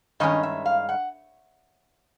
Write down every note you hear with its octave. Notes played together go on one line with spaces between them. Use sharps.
G2 D#3 G#3 C#4 D#5
E5
F5
F#5